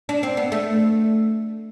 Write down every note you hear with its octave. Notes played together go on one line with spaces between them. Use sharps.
D4
C4
B3
A3